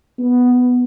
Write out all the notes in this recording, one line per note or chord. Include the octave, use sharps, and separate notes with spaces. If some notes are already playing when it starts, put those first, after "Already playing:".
B3